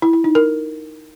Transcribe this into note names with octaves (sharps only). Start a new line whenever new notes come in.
E4
E4
D#4
A#4